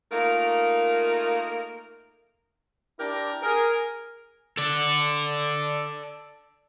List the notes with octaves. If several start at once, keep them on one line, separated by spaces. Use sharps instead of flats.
A3 A#3 D#4 F4 A#4
D4 E4 G4 A#4
G#4 A#4
A4 D5